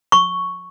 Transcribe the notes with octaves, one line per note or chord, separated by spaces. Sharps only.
C#6